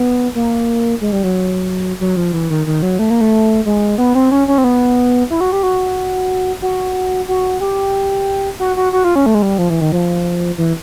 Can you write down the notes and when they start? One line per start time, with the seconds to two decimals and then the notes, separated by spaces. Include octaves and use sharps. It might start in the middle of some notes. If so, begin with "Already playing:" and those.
Already playing: B3
0.35 A#3
1.01 G#3
1.12 G3
1.24 F#3
2.01 F#3
2.17 F3
2.33 E3
2.50 D#3
2.67 D#3
2.82 F#3
2.99 A3
3.10 A#3
3.21 A3
3.66 G#3
3.98 B3
4.15 C4
4.31 C#4
4.48 C#4
4.58 C4
4.64 B3
5.30 E4
5.41 F#4
5.52 G4
5.63 F#4
6.62 F#4
7.28 F#4
7.61 G4
8.60 F#4
8.76 F#4
8.93 F#4
9.04 F4
9.16 C#4
9.26 A3
9.35 G#3
9.42 G3
9.58 F3
9.70 E3
9.81 D#3
9.92 F3
10.58 E3